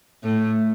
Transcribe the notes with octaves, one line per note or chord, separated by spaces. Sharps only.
A2 A3